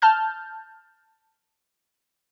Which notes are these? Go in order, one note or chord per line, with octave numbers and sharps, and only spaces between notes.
A5 F6 G6